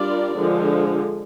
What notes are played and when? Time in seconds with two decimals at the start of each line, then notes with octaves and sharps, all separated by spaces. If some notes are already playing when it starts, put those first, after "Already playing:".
Already playing: G3 D4 F4 A#4 D5
0.37 D3 F3 G#3